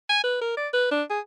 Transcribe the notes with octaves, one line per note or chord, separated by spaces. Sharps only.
G#5
B4
A#4
D5
B4
D4
G#4